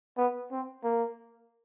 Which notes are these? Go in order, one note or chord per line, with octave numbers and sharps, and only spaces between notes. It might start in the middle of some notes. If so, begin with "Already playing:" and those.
B3
C4
A#3